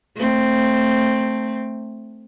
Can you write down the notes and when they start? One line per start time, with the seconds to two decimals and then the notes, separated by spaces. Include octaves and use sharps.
0.16 A3 C4